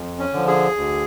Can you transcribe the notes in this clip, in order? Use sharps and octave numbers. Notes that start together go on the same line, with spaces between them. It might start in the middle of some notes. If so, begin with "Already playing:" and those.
Already playing: F2
C#4
D3 F3
G#4
D2